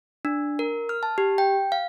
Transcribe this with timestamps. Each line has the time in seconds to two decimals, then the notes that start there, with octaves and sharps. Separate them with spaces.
0.25 D4
0.59 A#4
0.89 F6
1.03 A5
1.18 G4
1.38 G5
1.72 F5